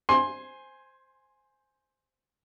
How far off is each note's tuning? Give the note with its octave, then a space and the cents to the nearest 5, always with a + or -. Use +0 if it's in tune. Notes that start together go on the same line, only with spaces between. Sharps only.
C5 +0 G#5 +0 C6 +20